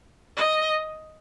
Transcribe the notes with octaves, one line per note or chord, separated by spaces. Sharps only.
D#5